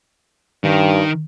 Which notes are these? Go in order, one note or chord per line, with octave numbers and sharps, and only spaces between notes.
G2 D#3